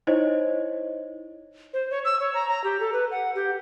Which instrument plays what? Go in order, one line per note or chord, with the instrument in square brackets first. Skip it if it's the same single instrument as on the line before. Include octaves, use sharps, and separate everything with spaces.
[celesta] D#4 E4 C5 C#5 D#5
[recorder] C5
C#5
E6
C#5
A#5
A#5
G4
A4
B4
F#5
G4